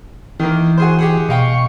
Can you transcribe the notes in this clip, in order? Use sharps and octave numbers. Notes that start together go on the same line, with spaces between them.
D#3 E3 A#3
F#4 G#4 C5
G4 G#4 F#5
B2 D#5 F5 G5 C#6